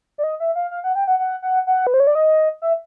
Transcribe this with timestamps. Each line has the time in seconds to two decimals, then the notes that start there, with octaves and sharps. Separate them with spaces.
0.18 D5
0.24 D#5
0.40 E5
0.56 F5
0.71 F5
0.84 F#5
0.95 G5
1.07 F#5
1.19 F#5
1.42 F#5
1.67 F#5
1.87 B4
1.94 C5
2.00 C#5
2.07 D5
2.15 D#5
2.62 E5